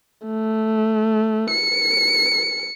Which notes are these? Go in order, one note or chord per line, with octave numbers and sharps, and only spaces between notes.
A3
C#7